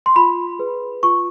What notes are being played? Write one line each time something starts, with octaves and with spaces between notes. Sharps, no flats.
C6
F4 B5
G#4 B4
F4 C#6